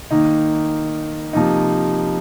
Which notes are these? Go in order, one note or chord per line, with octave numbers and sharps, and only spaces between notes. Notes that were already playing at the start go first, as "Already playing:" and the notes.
D#3 A#3 D#4
C3 F3 A#3 D#4